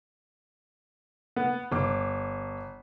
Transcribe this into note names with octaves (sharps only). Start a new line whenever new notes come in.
B3
G1 D6